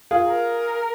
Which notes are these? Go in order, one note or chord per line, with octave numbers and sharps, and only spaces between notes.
F4 G#4
A#4